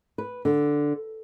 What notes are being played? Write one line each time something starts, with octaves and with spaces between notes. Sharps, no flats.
B4
D3